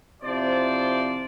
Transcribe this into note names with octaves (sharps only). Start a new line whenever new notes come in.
C3 F3 E4 C5 D5